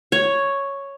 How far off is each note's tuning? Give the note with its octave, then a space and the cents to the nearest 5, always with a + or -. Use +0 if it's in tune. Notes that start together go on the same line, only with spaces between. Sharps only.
C#5 +0